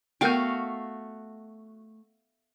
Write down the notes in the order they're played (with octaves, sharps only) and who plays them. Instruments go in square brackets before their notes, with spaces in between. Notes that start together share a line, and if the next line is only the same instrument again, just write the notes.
[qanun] A3 F#4 F5 [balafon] B3 A#4 G5